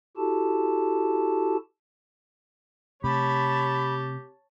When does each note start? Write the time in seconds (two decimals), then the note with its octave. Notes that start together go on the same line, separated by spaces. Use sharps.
0.17 E4 F#4 G4 A4 A5
3.04 C3 A3 C4 G4 C#5 A5 B5